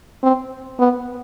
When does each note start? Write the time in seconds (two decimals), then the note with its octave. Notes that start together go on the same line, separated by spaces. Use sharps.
0.23 C4
0.79 B3